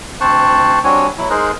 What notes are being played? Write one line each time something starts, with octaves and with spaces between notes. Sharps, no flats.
D2 C4 C5 A5 C#6 F#6
G3 C4 D4 F#4 C#5 G#5
B2 F#3 E4
G#3 D#4 G#4 A#4 C5 F#6